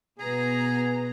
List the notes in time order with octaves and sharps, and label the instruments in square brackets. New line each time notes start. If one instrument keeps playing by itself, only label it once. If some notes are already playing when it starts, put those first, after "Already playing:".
[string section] B2 B3 A#5 [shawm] G#4